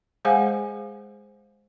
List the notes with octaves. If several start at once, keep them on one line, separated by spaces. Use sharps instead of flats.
G#3 G#4 C5 F5 F#5 G#5